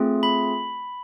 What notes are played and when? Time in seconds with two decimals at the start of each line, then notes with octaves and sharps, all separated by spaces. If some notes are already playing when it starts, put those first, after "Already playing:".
Already playing: A3 C4 F4 G#4
0.23 B5